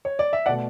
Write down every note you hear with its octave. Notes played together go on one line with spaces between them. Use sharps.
C#5
D5
E5
B2 A3 D5 F#5